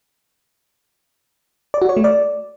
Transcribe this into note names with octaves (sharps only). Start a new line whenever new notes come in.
D5
F#4
C#5
A3
D5